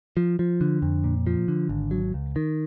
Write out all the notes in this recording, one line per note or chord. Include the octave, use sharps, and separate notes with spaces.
F3
F3
D3
F2
A#2
F3
D3
G#1
F#3
C#2
D#3